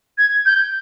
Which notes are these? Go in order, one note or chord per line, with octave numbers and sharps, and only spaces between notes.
G#6
G6